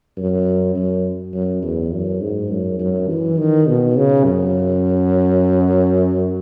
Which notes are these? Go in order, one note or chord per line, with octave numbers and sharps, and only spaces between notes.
F#2
F#2
F#2
E2
F#2
G#2
F#2
F#2
E3
D#3
B2
C#3
F#2